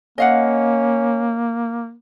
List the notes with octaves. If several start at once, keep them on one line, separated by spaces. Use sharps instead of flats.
A#3 C#4 D#5 F5 F#5